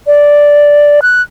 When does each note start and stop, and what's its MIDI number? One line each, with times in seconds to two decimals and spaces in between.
0.07 1.00 74
1.02 1.22 90